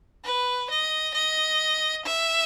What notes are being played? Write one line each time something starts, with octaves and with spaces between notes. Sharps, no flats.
B4
D#5
D#5
E5